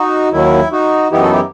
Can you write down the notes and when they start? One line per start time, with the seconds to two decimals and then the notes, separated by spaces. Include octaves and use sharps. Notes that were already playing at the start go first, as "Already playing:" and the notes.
Already playing: D#4 F#4
0.33 D#2 D#3 F#3 E4
0.72 D#4 F#4
1.12 F#2 E3 B3 D#4 E4 G4
1.22 F#4 A4
1.32 E4 G4